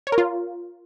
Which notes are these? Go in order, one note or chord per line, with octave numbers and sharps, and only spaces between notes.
C#5
A#4
F4